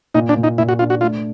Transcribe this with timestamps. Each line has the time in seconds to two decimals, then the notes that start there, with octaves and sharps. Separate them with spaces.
0.15 A#2 D#4
0.29 D4
0.36 A#2
0.44 D#4
0.58 A#2 E4
0.69 F#4
0.79 D4 F4
0.90 F#4
1.01 A3 F4